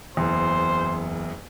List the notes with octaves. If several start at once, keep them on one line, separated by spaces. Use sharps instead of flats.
F#1 E2 C5